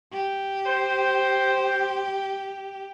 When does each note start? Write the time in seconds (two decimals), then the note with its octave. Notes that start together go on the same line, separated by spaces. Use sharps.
0.13 G4
0.66 C5